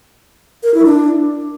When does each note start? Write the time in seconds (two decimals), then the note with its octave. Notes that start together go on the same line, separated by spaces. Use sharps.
0.63 A#4
0.74 E4
0.85 D4